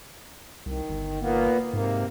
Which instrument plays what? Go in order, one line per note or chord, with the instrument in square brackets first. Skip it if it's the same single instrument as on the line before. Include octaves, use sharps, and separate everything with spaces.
[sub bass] C2 [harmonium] D#3
[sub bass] G1
[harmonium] A#2 A#3 B3
[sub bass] G#2 [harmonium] C3 A#3